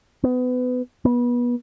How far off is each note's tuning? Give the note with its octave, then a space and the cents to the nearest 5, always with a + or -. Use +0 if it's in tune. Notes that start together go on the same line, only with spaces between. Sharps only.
B3 +25
B3 -25